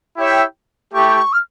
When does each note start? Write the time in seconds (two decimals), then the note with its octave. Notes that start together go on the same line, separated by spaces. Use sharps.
0.17 E4 G4 C#5 E5 G5
0.93 A3 E4 G4 C#6
1.32 F6